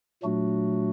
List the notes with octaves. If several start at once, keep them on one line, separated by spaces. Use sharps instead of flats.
A#2 F#3 A3 D4 F#4